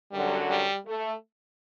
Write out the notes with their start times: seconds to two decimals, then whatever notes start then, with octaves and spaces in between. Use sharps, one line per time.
0.12 F#2 D3 F#3 G3
0.50 G3
0.86 A3